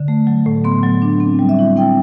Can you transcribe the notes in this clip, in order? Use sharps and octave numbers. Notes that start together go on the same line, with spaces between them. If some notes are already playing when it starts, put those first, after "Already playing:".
Already playing: D3
A3
F#3
A2
B3 C6
F#3
D4
C4
G3
E5
E4
C4 G5